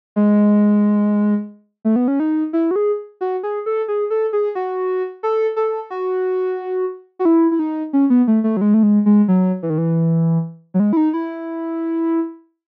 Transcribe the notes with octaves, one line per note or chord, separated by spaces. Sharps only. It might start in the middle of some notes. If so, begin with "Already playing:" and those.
G#3
A3
B3
C#4
D#4
E4
F#4
G#4
F#4
G#4
A4
G#4
A4
G#4
F#4
A4
A4
F#4
F#4
E4
E4
D#4
C#4
B3
A3
A3
F#3
G#3
A3
G#3
G#3
F#3
E3
D#3
E3
F#3
G#3
E4
D#4
E4